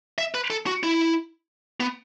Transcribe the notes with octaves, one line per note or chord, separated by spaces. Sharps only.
E5
B4
A4
F#4
E4
B3